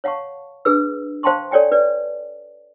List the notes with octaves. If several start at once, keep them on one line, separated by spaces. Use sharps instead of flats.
C#5 F5 F#5 A5 C#6
D4 G#4 B4 E6
C5 F5 G5 A5 C6 C#6
A4 C#5 D5 G5 G#5
B4 D5